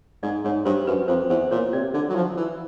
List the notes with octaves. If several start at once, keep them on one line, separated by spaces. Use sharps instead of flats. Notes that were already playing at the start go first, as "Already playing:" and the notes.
G#2 D5
G#2 C#5
G2 C5
F#2 B4
F2 C5
E2 C5
A#2 C#5
C3 D5
D3 D5
F#3
F3
E3